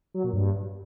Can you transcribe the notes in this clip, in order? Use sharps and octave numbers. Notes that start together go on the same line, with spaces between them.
F#3
A#2
G2